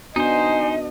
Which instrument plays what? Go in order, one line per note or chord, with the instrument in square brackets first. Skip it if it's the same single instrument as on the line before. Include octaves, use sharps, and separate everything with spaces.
[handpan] B3 D4 F#4 [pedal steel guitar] D#4 C5 [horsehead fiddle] D#5 [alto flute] G#5